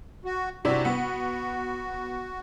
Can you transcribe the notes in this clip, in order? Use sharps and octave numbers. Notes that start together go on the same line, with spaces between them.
F#4
C3 D4 E4 F#4
B3